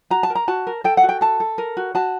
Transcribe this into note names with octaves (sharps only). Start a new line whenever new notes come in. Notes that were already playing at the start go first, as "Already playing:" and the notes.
F#4 A#5
A5
A#4
A#5
F#4 A5
A#4
A4 G5
F#5
F#4
G5
A4 A5
A4
A#4
F#4
F#4 A5